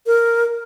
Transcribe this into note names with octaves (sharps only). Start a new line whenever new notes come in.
A#4